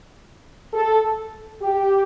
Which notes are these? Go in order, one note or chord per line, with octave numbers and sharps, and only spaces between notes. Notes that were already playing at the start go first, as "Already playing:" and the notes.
A4
G4